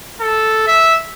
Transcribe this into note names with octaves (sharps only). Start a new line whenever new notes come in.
A4
E5